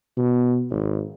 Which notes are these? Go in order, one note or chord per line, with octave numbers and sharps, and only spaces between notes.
B2
G#1